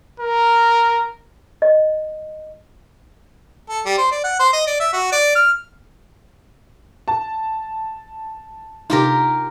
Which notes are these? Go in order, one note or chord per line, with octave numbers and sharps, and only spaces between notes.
A#4
D#5
A4
G3
C5
D5
F#5
C5
D#5
D5
E5
F#4
D5
F6
A5
C3 D#4 F4 G4 A#4